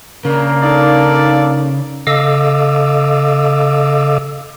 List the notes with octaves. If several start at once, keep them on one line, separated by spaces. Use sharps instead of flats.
C#3 A#3 D4 A#4
D#4 A4 D5 F5
C#3 A4 D#5 F5 D6 E6